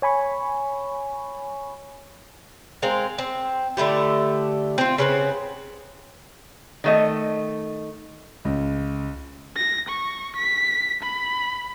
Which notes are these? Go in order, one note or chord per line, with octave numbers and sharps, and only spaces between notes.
C#5 G#5 B5 C#6
G#3 C4 A#4 F5
C4
D3 A3 E4 G4
C4 F4
C#3 B3 C4
D#3 A3 D#5
C#2
A#6
C#6
B6
B5